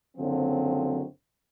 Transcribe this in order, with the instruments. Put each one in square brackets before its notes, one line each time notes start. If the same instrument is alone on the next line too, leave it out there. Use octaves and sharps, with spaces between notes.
[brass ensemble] F#1 D3 F3 F#3 C4